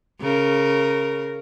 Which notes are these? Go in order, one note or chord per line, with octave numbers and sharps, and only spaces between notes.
C#3 A#4